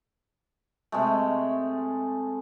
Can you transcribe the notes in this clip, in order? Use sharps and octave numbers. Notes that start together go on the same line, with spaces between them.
C3 G#3 A3